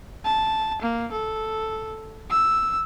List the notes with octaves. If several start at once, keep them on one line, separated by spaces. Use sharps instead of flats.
A5
A#3
A4
E6